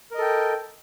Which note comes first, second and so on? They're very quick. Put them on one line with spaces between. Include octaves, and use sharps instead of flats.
A#4 D#5 A4 G5